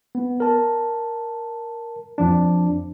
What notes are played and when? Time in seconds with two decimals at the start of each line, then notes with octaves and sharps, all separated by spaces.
0.15 B3
0.40 A#4 A5
2.18 F2 F3 D4